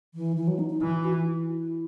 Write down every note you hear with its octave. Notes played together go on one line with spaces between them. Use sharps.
E3
E3
F#3
D#4
D#4
E3 E4
F#4
E4
E4